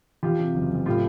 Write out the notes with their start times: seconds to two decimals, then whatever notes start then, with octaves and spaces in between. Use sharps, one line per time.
0.23 E2 F4 G4
0.39 C3
0.54 F#1
0.70 F#1
0.86 A2 F4 G4